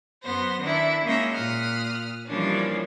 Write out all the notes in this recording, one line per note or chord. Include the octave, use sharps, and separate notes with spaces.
F#2 B3 C5 A#6
D#3 D4 E4
G#3 A#3 C#4 D#4 D#5 E5
A#2 D#6 F6 F#6
E3 F3 G3 A#3 C#4 D4